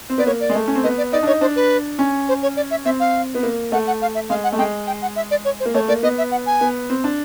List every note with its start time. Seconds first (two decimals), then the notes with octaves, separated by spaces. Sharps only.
0.10 C4
0.18 B3 D5
0.26 A#3 C#5
0.40 D5
0.50 G#3
0.55 A3
0.68 C#4
0.75 C4
0.83 B3 D#5
0.98 D5
1.12 D#4 D5
1.23 D4
1.27 D#4 C#5
1.41 D4 C5
1.56 B4
1.99 C#4
2.29 C5
2.43 C#5
2.57 D5
2.71 E5
2.85 C4 E5
3.00 F5
3.35 B3
3.43 A#3
3.72 A3 F#5
3.87 F#5
4.02 F5
4.15 E5
4.29 G#3 F5
4.44 F#5
4.52 A3
4.58 G#3 G5
4.87 G5
5.02 F#5
5.16 E5
5.31 D5
5.45 C#5
5.60 C5
5.65 A#3
5.74 A3 C#5
5.88 A#3 D5
6.03 B3 D#5
6.18 E5
6.31 F#5
6.46 G#5
6.61 B3
6.90 C4
7.04 D4